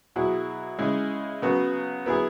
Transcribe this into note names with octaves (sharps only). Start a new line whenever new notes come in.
B2 F#3 E4 G#4
C#3 G#3 E4 G#4
C#3 F#3 B3 F#4
F#3 B3 E4 G#4